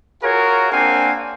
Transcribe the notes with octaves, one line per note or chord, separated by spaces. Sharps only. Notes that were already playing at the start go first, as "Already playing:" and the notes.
F4 F#4 G#4 A#4 C#5 F5
A#3 C4 D4 F5 F#5 G#5